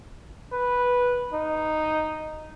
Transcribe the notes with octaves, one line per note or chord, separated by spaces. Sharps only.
B4
D#4